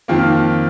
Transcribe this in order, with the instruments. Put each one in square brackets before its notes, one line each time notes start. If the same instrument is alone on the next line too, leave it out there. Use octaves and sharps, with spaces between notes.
[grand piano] F2 D#3 A#3 F4